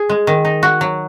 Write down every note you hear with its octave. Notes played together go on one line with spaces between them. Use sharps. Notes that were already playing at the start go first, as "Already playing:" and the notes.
Already playing: G#4
G#3
D#3
D#4
F#4
F#3